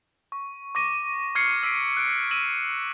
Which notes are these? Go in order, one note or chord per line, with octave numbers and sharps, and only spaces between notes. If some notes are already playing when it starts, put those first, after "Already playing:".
C#6
C#6 D6 A#6 D#7
C#6 F6 G#6 C7 C#7
E6 B6 C7 D7 D#7
F#6 D7
E6 A#6 B6 D#7 E7 F#7